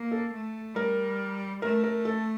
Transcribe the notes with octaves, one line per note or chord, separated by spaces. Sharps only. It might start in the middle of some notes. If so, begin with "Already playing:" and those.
Already playing: A#3
A4
A3
G3 A#4
A3 A#4
A#4
A4